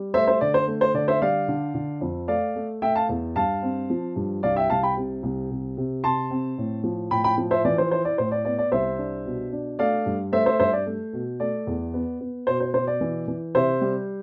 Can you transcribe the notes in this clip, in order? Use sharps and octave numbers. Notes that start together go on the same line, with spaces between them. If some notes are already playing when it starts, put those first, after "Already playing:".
Already playing: G3
A3 C5 E5
C5 E5
D3 D5
C5
A3
C5
D3 D5
C5 E5
G3 D5 F5
D3
D3
F2
A3 D5 F5
A3
A3 E5 G5
F5 A5
E2
G2 F5 A5
C4
F3
G2
C2 D5 F5
E5 G5
C2 F5 A5
G5 B5
C3
C2
C3
C3
C3 A5 C6
C4
A2
F3
A2 G5 B5
G5 B5
F3
C5 E5
E3 D5
C5
E4 C5
D5
A2 C5
D5
B3 D5
D5
C2 C5 E5
D4
B2
D4
A3 D5 F5
G2
A3 C5 E5
C5 E5
G2 C5 E5
D5
A3
B2
A3 D5
E2
B3
B3
B2 C5
C5
B2 C5
D5
E3
E3
C3 C5 E5
G3